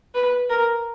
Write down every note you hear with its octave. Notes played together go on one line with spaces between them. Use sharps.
B4
A#4